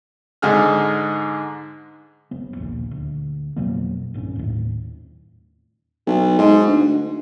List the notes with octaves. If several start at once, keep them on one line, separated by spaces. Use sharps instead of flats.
G#2 D3 D#4 G#4 F6
F#1 B3
A#1 D#2 A#2
D2
F2 B2 F#3 A#3
B1 G2 A#2 C#4
D#2 A2
B1
G#2
D2